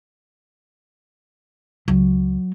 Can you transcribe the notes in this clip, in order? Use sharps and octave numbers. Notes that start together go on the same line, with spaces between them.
C#2 F#3